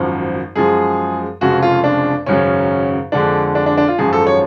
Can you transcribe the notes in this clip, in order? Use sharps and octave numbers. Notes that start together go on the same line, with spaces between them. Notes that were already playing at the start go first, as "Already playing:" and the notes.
Already playing: G#1 F#2 F3
F#2 F3 G#3 G#4
F1 F2 C#3 G#3 F#4
F4
D4
G#1 F#2 C#3 F#3 C#4
F2 D3 G#3 D4
D4
D4
D4
F4
G#1 F#2 F3 G#3 G#4
A4
C#5